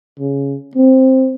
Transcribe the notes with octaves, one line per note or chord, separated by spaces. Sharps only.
C#3
C4